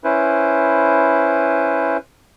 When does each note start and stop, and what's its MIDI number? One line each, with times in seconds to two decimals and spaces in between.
0.04 1.97 61
0.04 1.97 64
0.04 1.97 71
0.04 1.97 72